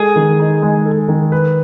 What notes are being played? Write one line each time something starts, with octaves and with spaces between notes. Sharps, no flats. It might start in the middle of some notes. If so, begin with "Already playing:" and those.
Already playing: G#3 G#4 A4
D#3
D#4
G#3
A4
D#3
B4